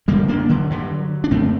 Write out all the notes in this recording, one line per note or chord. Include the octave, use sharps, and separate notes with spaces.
F#2 D3 G3 A#3
A#3 D4
D3 F#3
G2 D3
D4
F#2 D3 A3 C4